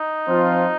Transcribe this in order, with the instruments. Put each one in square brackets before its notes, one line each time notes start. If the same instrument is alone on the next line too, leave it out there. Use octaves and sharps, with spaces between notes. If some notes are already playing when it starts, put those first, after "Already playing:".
Already playing: [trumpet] D#4
[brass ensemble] F3 C4 F4